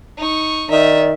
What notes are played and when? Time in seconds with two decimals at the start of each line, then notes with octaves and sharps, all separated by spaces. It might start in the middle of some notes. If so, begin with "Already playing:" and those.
0.18 D#4 C#6
0.70 D#3 D#4 D5 E5